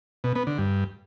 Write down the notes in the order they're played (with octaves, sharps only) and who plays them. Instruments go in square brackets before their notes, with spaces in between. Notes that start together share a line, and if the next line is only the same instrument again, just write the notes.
[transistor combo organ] B2
B3
D3
G2